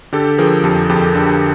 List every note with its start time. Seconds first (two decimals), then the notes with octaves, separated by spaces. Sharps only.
0.13 D3 G4 A4
0.38 F3 G#4 A#4
0.64 F2 G4 A4
0.89 F2 G4 A4
1.15 D3